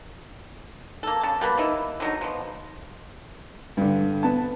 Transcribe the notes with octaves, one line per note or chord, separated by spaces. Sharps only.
A#3 A4
C#3 A5
G3 A#3 B3 B5
A#3 D#4 E4
D3 F#3 D#4
B2 F3
G2 D3
B3 A5